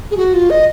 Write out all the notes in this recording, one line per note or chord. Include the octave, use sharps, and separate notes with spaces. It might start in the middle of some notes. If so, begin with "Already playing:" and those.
G#4
F#4
F4
D#5